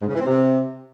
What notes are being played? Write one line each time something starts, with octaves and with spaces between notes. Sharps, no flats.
G#2
C#3
E3
C4
C3